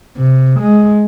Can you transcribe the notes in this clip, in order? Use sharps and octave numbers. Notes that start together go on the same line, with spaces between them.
C3
G#3